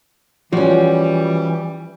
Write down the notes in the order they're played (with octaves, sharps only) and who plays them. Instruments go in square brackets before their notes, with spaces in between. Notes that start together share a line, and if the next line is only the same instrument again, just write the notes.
[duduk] E3 [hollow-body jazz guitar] F3 [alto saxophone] G3 [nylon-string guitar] C#4 F#4